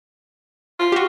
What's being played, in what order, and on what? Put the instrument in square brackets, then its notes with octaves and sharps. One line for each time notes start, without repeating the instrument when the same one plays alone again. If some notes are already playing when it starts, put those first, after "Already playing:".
[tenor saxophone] F4
[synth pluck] F#4 G4